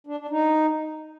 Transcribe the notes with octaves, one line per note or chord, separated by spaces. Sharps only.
D4
D4
D#4